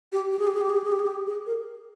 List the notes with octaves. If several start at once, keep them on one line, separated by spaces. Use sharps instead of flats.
G4
G4
G#4
G4
G#4
G4
G#4
G4
G#4
G4
G#4
G4
G#4
A#4